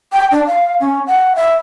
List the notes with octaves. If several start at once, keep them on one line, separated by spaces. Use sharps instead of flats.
G5
D4
F5
C#4
F#5
E5